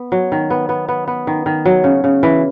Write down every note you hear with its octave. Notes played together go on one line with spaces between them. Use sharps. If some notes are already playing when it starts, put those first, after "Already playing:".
Already playing: B3
F#3
D#3
B3
B3
B3
B3
D#3
D#3
F#3
C#3
C#3
E3